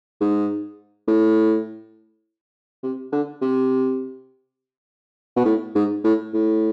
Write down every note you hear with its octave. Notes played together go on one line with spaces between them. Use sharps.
G#2
A2
C3
D3
C3
B2
A2
G#2
A2
A2